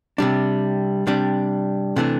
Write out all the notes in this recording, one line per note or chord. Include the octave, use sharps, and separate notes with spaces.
C3 G3 D4
C3 G3 D4
C3 E3 A3 D4